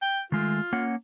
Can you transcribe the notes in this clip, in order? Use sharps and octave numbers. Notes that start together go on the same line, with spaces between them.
G5
D#3 G#3 A3 F4
A#3 C#4 F#5